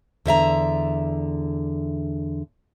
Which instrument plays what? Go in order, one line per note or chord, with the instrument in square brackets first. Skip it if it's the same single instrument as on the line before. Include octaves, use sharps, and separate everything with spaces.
[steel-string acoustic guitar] E2 D3 E5 A#5